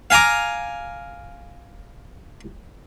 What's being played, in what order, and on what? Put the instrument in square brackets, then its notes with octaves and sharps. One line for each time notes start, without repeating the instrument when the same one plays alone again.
[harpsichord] F5 G#5 A#5 D6